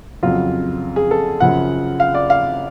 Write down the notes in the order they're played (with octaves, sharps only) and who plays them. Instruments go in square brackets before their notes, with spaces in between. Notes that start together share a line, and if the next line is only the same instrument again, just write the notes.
[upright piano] F2 C#3 F#3 F4
G#4
A4
F#2 C#3 F3 F#5
F5
D5
F5